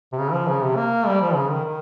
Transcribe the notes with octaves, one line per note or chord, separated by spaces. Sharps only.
C3
C#3
F3
C#3
C3
A#3
G3
F3
C#3
D#3
D#3